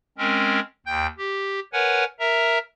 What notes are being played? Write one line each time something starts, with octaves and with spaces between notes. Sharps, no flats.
G#3 C4 C#4 A#4
D#2 G5 G6
G4
A#4 B4 C#5 F#5 G#5
A#4 E5 A#5